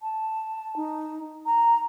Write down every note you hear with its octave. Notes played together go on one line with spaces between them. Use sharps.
A5
D#4
A#5